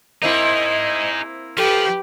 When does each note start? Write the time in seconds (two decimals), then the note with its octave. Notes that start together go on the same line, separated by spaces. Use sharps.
0.22 A#3 C4 D#4 E4 G#4 D#5
1.57 F3 G4 A4 B4